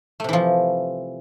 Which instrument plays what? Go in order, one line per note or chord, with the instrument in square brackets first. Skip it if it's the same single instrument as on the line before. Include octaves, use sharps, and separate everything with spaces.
[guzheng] A3
C3
E3
F3